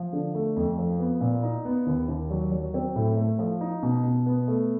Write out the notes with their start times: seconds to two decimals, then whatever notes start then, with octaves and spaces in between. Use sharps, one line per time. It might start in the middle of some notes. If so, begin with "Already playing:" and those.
Already playing: F3
0.13 D3
0.35 A3
0.56 F2
0.78 F3
0.99 B3
1.21 A#2
1.43 D#4
1.65 B3
1.86 D#2
2.08 D#2
2.31 F#3
2.52 F#3
2.74 C4
2.96 A2
3.17 A3
3.39 F3
3.61 D#4
3.83 B2
4.04 B2
4.26 B3
4.48 A3